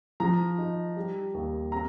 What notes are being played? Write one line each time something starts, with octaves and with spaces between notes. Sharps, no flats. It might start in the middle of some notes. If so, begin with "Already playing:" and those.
F3 A#5
D#4
G3
D#2
C4 A#5